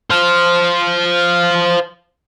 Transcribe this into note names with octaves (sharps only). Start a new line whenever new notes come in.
C5 F5